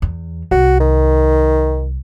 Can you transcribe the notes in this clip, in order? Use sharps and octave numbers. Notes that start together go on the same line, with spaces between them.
E2
C2 F#4
D#3